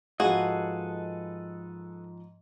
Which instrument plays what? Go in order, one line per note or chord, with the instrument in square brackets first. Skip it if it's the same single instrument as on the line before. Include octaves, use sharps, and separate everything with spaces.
[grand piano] G#2 F3 [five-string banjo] F#4 [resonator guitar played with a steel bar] G#4 F5 [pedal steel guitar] A4 B4 D#5